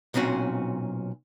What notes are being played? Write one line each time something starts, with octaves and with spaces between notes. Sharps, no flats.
B1 A#2 C4 C#4 F#4